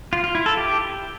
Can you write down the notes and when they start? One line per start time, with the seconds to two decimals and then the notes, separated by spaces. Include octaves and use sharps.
0.13 F4
0.24 F4
0.35 E4
0.46 A4
0.57 G4